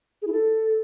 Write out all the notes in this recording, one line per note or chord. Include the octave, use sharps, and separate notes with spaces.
G#4
E4
A4